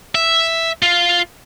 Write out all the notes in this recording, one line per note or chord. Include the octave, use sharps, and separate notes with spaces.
E5
F4